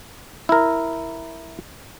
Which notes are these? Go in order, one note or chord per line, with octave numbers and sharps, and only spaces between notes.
E4 A#4